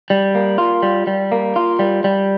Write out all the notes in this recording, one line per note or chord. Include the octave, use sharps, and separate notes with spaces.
G3
A#3
F4
G3
G3
A#3
F4
G3
G3